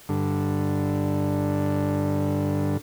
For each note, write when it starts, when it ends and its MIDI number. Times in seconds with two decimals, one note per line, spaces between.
0.09 2.77 43
0.09 2.77 50